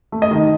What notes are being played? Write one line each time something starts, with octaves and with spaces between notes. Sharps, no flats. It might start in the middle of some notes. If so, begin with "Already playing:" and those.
A3
D#5
D#3